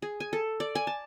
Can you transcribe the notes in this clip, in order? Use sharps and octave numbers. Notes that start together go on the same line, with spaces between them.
G#4
G#5
A4
D5
G#5
A5